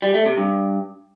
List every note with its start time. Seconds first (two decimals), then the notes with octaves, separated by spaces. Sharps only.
0.02 G3
0.14 A3
0.26 C3
0.37 G2